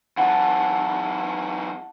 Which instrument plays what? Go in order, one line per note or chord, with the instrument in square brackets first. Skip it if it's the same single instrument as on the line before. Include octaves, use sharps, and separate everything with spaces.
[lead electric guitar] F#2 E3 [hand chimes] F#5 A5